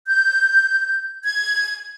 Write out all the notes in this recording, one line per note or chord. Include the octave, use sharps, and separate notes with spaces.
G6
G#6